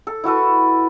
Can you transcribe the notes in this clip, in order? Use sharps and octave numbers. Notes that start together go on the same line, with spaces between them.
A4
E4 F#4 A4 B4